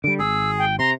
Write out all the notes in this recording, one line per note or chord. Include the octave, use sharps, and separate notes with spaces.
D3 G3 D7
G#1 G#4 E6
G5
C3 A#5 C6